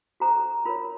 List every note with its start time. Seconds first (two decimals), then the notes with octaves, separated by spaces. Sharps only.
0.20 F#4 A4 C5 A#5
0.65 F4 A#4 C#5 B5